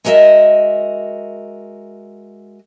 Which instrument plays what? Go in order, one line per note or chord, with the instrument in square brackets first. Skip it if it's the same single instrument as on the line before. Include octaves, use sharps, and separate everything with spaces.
[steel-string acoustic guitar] G#3 F#4 A#4 D#5 E5